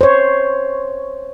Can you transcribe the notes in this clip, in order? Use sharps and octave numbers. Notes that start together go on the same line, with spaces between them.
C5 C#5